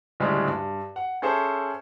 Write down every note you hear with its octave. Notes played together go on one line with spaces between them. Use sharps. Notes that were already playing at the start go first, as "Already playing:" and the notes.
D2 A2 C#3 G3 G#3
G2
F#5
C#4 G#4 A4 C5 E5